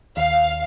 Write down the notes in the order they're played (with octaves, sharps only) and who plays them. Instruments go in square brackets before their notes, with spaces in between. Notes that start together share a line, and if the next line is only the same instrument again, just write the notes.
[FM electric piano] D#2 [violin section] F5